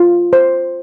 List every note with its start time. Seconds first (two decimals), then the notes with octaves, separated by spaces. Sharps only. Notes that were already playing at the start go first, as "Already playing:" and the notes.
Already playing: F4
0.33 C5